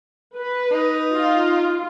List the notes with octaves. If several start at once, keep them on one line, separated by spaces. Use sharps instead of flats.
B4
D#4
F4